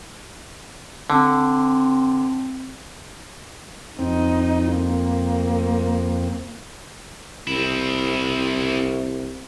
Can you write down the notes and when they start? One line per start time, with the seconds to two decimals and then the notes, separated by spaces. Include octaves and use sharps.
1.10 D3 C4
3.98 F2 C4 D#4
4.76 A#3
7.47 C2 C4 E4